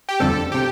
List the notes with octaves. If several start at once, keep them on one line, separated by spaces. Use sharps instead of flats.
G4
F2 D3 G3 C4 A4
C3 G4